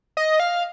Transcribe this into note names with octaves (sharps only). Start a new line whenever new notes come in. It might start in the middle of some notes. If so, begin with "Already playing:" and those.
D#5
F5